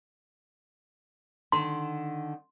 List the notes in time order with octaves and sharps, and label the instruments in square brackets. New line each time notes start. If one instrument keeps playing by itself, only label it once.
[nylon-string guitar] D3 D#3 [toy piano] C6